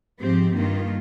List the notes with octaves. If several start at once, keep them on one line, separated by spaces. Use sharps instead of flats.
G#2 F3 C4 G4
G2 D#3 A#3 F4